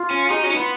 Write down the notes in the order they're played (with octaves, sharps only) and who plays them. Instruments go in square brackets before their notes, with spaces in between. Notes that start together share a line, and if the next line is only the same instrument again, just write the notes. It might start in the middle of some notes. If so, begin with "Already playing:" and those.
Already playing: [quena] F4
[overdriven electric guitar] C#4
[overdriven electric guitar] D#4 [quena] G#4
[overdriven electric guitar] C#4 [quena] F#4
[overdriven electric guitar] C#4 [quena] D#4
[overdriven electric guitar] B3 [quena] F4